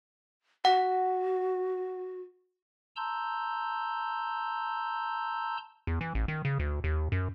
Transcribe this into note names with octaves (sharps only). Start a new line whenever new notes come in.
F#4 F#5
A5 A#5 C6 E6 G6
E2
E3
A1
D#3
C#3
D2
D#2
F#2